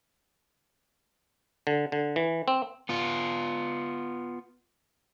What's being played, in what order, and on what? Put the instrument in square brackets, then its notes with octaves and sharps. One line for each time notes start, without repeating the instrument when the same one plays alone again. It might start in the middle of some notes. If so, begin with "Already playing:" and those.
[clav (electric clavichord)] D3
D3
E3
C4
[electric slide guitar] B3 F4